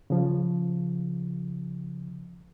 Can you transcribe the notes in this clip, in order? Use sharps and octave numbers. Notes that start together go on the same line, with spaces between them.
C#3 F3